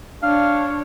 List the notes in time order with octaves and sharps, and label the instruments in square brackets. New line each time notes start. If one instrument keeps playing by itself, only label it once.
[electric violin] D4 C#5 [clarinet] F5